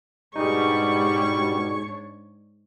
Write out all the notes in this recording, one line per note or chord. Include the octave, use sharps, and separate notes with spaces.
G#2 B2 G3 D4 D#4 G#4 C#5 C#6